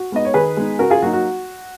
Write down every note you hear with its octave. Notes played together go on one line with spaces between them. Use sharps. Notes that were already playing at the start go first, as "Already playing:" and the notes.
Already playing: F#4
G#3 B3 D#4 D#5
C#5
D#3 G#4 B4
G#3 B3 D#4
C#3 F#4 A#4
F4 G#4
F#3 A#3 D#4 F#4
F#4